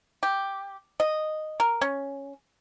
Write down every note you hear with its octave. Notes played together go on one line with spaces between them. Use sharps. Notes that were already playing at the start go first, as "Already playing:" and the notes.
G4
D#5
A#4
C#4